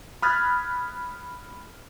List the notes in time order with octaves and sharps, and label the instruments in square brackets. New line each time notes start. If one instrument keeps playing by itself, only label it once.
[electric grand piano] B5 D#6 F6 F#6 G#6 A6